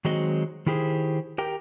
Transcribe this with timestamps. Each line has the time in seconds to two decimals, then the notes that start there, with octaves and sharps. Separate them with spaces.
0.05 D#3 F#3 G#3 C4 F#4 D#5
0.66 D#3 E4 G4 G#4 C5
1.38 G4 A#4 G5